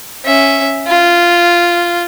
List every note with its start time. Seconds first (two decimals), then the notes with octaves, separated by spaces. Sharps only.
0.25 C#4 E5
0.87 F4